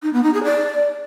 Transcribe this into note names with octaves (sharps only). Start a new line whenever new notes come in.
D#4
B3
D#4
G#4
D5